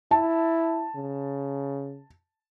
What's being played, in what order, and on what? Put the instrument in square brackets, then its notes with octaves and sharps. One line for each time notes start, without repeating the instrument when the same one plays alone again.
[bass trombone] E4 [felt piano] A5
[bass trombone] C#3